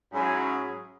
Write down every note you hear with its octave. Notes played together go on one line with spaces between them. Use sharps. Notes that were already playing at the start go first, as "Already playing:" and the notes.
G#2 F#3 C#4 E4 G#4